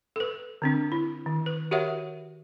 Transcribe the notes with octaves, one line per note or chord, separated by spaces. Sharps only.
A4 B4
D3 C4 D4
E4
D#3
B4
F#4 G4 A#4 C#5 E5 F#5